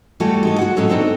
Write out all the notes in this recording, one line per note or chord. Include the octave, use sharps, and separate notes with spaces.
E3 G3 A3 F#4 G4 A4
G#3 D#4 A4
F#4 F#5
A2 F#3 G#3 C#4 A4 C#5
B3 C4 D4 D#4 A4